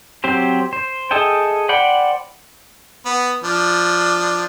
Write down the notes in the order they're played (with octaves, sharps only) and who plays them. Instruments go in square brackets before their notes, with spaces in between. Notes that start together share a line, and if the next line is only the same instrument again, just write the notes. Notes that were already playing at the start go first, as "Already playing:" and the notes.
[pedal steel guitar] F#3 C4 G4 C5
C5
G#4 A4 D#5 E5 G5
C5 D5 F#5 G5 B5
[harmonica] B3
F3 D4